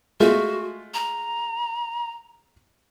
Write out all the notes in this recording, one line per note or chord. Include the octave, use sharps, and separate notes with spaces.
G#3 A3 F4 F#4
A#5